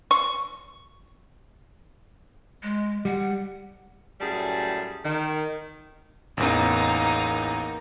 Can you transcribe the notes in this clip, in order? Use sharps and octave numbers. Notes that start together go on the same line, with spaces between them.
C#6
G#3
G3 F#5
F#2 A2 G3 G#4 A5
D#3
A1 E2 A#3 D#4